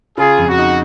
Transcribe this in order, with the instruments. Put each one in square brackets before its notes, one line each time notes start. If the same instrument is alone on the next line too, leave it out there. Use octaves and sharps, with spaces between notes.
[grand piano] C#3 [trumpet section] F4 G#4
[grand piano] F2
[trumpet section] F#4
[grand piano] D#4